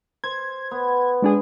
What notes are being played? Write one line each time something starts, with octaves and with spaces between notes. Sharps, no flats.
C5 G#6
B3
G#3 D4 G#4